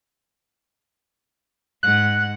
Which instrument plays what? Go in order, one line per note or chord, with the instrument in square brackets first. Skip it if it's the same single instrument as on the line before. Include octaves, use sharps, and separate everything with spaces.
[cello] G#2 F#5 [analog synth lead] F#6